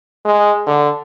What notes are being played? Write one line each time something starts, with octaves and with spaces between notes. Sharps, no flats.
G#3
D3